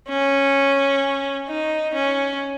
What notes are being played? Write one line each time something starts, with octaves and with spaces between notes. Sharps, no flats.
C#4
D#4
C#4